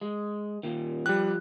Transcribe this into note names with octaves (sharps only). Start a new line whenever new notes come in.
G#3
A#2 D#3
F3 G3 G4 F#6